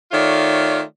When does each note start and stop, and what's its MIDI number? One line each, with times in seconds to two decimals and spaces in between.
0.12 0.81 51
0.12 0.81 57
0.12 0.81 65
0.12 0.81 73
0.12 0.81 74